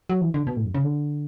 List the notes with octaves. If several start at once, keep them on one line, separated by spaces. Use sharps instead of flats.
F#3
E3
D3
B2
A2
F#2
C#3
D3